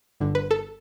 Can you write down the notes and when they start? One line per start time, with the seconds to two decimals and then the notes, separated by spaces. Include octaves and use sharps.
0.20 G1 G2 D3
0.35 B4
0.51 A4